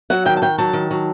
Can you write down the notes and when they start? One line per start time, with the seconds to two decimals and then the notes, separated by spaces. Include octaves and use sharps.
0.10 F#3 F#5
0.25 D#3 G5
0.37 A5
0.42 D#3 G5
0.58 F#3 A5
0.73 D#3
0.91 F#3